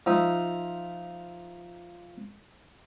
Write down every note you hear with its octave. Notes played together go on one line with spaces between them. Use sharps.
F3 D#4 E5